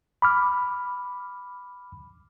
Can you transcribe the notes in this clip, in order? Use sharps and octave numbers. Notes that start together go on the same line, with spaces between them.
B5 D6 F6